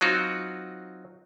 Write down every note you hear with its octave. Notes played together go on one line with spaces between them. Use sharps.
F#3 C4 D#4 F4 F#4